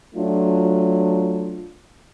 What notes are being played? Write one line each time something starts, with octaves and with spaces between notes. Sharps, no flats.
F#3 A3 D4 F4